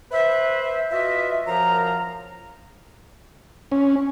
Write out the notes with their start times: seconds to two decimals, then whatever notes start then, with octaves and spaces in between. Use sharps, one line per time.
0.11 B4 C5 E5
0.91 F4 F#4 B4 D#5 E5
1.46 F#2 F3 F4 A#4 F5 A#5
3.72 C#4